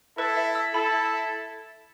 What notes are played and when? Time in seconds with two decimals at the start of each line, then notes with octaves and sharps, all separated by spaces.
0.18 E4 A4 B4
0.37 E5
0.55 E6
0.73 E4 A4 B5